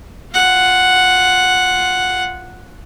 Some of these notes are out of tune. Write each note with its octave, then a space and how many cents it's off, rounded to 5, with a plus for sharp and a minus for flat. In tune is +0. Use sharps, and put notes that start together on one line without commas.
F4 +0 F#5 +0